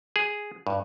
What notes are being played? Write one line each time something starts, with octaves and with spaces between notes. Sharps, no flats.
G#4
G2